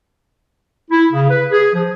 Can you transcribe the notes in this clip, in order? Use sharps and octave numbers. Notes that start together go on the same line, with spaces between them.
E4
C#3
B4
G#4
F3